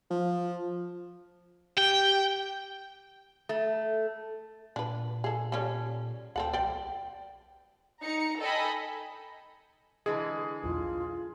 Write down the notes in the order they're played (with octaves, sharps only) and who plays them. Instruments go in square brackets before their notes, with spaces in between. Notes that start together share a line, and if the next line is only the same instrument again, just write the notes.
[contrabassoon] F3
[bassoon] G4 [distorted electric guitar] G5
[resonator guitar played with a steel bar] A3
[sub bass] A#2 [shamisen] D4 B4
[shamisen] G#4 A4
G3 C#4 A4
[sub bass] D2 [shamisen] C4 A4 F#5
[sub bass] B1 [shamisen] D5 G5
[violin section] D#4 A#5 C#7
A4 D#5 G5 G#5 B5
[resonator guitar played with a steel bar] D3 E3 G#3 [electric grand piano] G#4
[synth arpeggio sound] B1 E2 [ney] F4